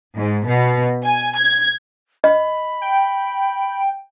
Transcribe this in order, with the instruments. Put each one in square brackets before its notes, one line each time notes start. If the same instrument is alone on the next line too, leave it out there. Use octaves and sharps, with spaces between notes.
[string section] G#2
B2
G#5
G#6
[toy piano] D#5 [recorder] B5
[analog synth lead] G5